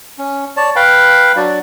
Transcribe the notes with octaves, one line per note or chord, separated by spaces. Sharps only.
C#4
C#5 D5 A5
B4 F5 G5 B5
F#3 D4 F#4 D5